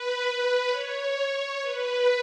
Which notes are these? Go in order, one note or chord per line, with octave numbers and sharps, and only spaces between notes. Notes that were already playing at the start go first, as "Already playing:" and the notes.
Already playing: B4
B4
C#5
B4